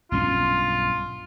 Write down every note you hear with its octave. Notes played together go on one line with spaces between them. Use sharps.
B1 G2 C#4 F4